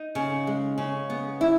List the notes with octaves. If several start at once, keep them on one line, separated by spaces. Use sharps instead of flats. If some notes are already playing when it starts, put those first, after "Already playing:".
Already playing: D#4
C#3
G#3
C#3
B3
E4